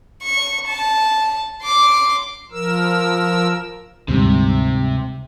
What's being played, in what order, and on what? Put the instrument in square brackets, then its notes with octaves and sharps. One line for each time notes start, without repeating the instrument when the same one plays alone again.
[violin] C#6
A5
C6 D6
[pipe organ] F3 A#4 E6
[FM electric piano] D2 G#2 G3 [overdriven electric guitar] C3